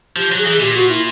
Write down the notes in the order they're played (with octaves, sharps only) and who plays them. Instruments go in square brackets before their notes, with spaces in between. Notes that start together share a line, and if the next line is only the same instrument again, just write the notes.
[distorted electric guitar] F3 [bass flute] G4
[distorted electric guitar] F#3
[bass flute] G#4
[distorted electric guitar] E3
[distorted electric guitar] A#2 [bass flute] G4
[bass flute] F#4
E4